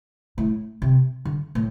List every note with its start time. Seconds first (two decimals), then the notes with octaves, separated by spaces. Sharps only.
0.38 A2
0.82 C3
1.25 D3
1.55 A2